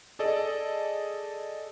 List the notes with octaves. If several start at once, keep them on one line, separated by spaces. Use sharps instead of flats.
G#4 A4 D5 D#5